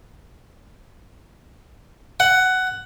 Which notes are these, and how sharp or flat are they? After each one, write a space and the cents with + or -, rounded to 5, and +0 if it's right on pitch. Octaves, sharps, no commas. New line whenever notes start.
F#5 +10